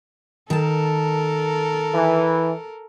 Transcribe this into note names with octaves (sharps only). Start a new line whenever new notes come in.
D#3 A4 A#4 A5
E3